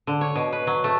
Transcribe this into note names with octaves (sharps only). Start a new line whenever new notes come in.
D3
C#5
B2
B4
F#3
A3